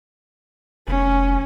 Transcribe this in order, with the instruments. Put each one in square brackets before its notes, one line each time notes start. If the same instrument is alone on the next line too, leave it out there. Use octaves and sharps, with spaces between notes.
[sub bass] F1 [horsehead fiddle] C#4